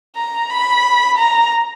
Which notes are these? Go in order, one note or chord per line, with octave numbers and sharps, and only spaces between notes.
A#5
B5
A#5